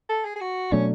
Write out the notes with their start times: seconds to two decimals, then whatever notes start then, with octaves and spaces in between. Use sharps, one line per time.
0.09 A4
0.25 G#4
0.36 G#4
0.41 F#4
0.72 B2 F#3 A3 C#4 D4